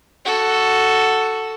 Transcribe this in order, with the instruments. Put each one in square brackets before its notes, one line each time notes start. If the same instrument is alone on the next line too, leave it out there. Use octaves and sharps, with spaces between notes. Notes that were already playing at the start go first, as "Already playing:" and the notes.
[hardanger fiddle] F#4 A4